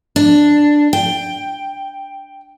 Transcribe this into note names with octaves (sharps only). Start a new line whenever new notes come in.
D4
G5